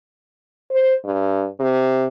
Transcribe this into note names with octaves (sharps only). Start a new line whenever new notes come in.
C5
G2
C3